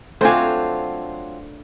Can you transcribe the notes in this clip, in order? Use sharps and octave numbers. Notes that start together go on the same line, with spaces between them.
F#3 A3 C4 D4 F4 C5 G#5